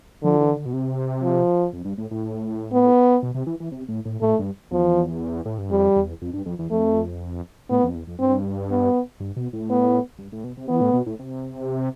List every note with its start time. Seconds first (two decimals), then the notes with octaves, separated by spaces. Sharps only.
0.23 D3 F3
0.40 E3
0.56 D3
0.65 B2
0.73 C3
1.23 F3
1.73 F2
1.85 G2
1.98 A2
2.11 A2
2.73 B3
3.23 B2
3.34 C3
3.47 E3
3.60 E3
3.72 C3
3.88 A2
4.05 A2
4.21 A2 A3
4.39 G2
4.71 E2 F3
5.45 A2
5.58 G2
5.71 F2 G3
5.96 E2
6.22 F2
6.33 G2
6.46 F2
6.59 E2
6.71 F2 A3
7.70 A2 B3
7.83 F2
7.95 E2
8.07 F2
8.20 G2 C4
8.70 B3
9.20 G2
9.36 B2
9.53 A2
9.70 B3
10.19 G2
10.32 A2
10.44 B2
10.57 C3
10.68 E3 B3
10.81 A2
10.93 B2
11.06 A2
11.19 C3